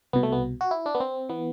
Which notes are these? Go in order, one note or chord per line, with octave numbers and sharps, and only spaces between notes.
C2 B2 B3
A3
B3
F#4
E4
D4
B3
C4
E3 B3